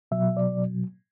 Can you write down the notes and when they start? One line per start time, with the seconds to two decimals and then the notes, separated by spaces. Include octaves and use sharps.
0.11 B2 F#3 E5
0.37 D5